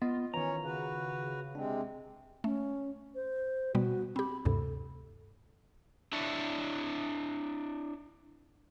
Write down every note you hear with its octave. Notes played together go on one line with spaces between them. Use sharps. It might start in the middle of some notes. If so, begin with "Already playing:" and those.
B3 F4 D#5
D#3 E3 C#4 F4 C#5 A#5
C#3 F#4 B4
C3 G#3 C4 D4
A3 C#4
C5
B2 G3 B3 F#4
C4 G4 B5
D2 G2 C3 A4
D4 E4 C#5 D5 E5